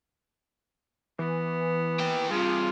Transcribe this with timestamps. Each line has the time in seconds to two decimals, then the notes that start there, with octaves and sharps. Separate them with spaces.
1.19 E3 B3
2.00 A#3 G5
2.31 G2 C3 F4 G#4